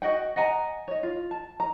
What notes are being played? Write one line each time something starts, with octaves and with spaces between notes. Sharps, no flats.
F#4 D#5 F#5 G5
D#5 F#5 G#5 A#5
C#5 D#5
F4
A5
A#5